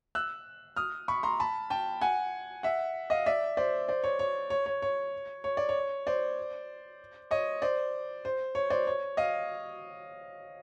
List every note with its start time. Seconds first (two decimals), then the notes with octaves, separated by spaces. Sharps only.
0.15 E6 F#6
0.76 D#6 F6
1.08 B5 C#6
1.23 A#5 C6
1.40 A5 B5
1.70 G5 A5
2.01 F#5 G#5
2.63 E5 F#5
3.10 D#5 F5
3.26 D5 E5
3.57 C5 D5
3.88 C5 D5
4.04 C#5
4.19 C#5
4.50 C#5
4.66 C#5
4.82 C#5
5.44 C#5
5.57 D5
5.69 C#5
6.07 C5 D5
7.31 C#5 D#5
7.62 C5 D5
8.25 C5
8.55 C#5
8.70 C5 D5
8.87 C#5
9.17 D#5 F5